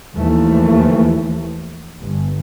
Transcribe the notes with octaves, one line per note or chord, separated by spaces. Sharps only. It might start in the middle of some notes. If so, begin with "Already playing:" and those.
D#2 E3 F3 A3
G1